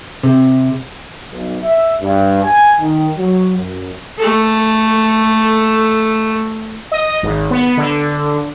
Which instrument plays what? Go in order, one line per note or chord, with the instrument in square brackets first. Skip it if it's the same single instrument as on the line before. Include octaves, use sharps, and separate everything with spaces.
[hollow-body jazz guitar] C3
[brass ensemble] B1
E5
G2
G#5
D#3
F#3
F#2
[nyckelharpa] A3 A4
[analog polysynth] D#5
G#1
B3
D3